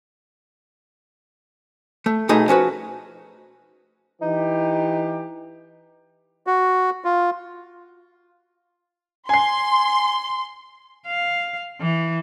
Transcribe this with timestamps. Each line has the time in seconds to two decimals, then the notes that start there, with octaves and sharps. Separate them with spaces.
2.06 A3
2.29 B1 A3 D#4 G#4 D#5 B5
2.48 F3 C#4 F#4 B4
4.22 E3 D#4 G4
6.47 F#4
7.04 F4
9.29 G#5 C6 C7
11.07 F5
11.81 E3